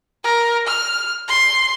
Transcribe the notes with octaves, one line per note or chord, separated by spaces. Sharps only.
A#4
F6
C6